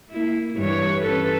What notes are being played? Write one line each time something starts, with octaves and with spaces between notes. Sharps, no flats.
A#3 E4
G2 E3 C#5
C#4 A4 B4